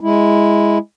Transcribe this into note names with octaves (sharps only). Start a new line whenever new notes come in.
G#3 E4